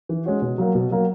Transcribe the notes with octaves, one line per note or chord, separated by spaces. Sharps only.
E3
G#3 C#4 F#4
B2
F#3 A#3
B2
F#3 A#3